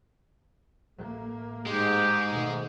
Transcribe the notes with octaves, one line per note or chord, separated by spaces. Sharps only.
A1 A3 A#3
G#2 G#3 G4
B2 D#3 A3